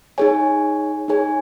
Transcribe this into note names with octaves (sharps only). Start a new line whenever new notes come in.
D#4 G#4 C#5 G#5
D#4 G#4 C#5 G#5